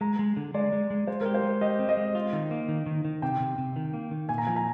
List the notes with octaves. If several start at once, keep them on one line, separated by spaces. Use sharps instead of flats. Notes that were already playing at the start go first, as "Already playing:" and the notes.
G#3 A#5
G#3
D3
G#3 D5
G#3
G#3
G#3 C5
G4 A#4
C5
G#3
G4 D#5
C4
D#5
G#3
F4
D#3
A#3
D#3
D#3
D#3
C3 G5
C3
C3
D#3
A#3
D#3
A#2 G#5
A#5
F3 G#5
A#5